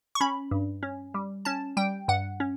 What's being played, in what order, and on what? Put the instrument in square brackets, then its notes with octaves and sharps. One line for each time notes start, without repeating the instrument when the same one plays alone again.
[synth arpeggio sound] C#6
C#4 B5
G2
C#4
G3
C#4 A5
G3 G5
G2 F#5
C#4